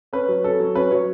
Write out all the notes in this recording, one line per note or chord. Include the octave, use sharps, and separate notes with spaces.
C#4 B4
F#3
C#4 A4
F#3
C#4 B4
F#3 C#5